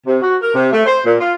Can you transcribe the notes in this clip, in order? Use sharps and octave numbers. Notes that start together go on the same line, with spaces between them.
C3
F#4
A#4
C3
A3
C5
A#2
F4